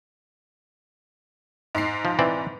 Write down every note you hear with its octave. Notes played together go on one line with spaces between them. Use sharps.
G#2 C7
F3
E3 C4 D5